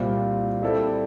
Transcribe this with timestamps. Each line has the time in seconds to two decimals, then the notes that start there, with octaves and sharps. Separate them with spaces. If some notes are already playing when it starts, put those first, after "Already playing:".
Already playing: C2 A#2 G3 C4 F4
0.62 G3 C4 E4 A4 D5